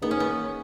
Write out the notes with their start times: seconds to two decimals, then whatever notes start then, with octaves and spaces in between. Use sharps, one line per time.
0.02 A#3 B3 D#4 G#4 B4
0.11 C#4
0.20 B3